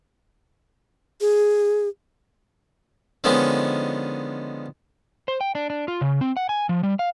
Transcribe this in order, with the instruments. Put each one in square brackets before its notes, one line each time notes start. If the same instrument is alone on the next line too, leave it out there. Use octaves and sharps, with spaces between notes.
[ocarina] G#4
[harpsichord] D3 D#3 F3 G#3 B3 C#4
[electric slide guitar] C5
G5
D4
D4
F4
C#3
C4
F#5
G#5
F3
G3
F5